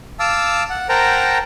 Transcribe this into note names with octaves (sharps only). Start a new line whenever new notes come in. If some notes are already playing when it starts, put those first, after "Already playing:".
F5 A5 D6 E6
F#5
A#4 C5 F#5 G5 A5 A#5